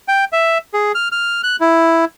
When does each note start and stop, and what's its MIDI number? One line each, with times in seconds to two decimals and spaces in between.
0.08 0.25 79
0.33 0.58 76
0.74 0.92 68
0.95 1.08 89
1.12 1.41 89
1.43 1.56 90
1.61 2.05 64